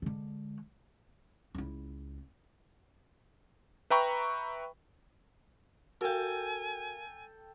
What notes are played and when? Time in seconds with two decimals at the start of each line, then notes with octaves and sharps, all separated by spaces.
0.02 D3 G#3
1.55 C#2 E4
3.90 B4 E5 G5 A#5 B5 C#6
6.01 F#4 A4 A#4 F5 G5 G#5